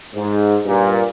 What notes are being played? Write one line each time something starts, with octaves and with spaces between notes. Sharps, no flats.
G#2
G2 A#2